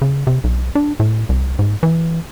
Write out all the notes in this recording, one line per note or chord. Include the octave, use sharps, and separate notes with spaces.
C#3
C3
B1
D4
A2
C2
G#2
E3